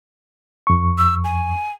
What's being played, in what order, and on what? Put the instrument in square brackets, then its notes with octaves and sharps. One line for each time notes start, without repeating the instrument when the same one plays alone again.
[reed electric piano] F2 C#6
[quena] E6
G#5